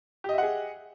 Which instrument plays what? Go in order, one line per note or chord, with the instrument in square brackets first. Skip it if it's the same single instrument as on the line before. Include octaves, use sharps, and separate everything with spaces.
[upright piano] G4
D#5
E5
F#5
G#4